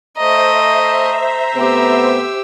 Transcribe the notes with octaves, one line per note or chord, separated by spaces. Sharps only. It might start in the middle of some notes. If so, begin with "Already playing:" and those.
A3 C5 D#5 E5 A#5
C3 A3 B3 G4 E6